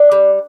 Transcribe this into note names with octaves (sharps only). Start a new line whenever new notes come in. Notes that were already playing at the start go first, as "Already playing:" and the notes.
Already playing: D4
G3